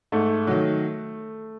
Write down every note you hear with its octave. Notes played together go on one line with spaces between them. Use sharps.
G#2 A3
D#3 F#3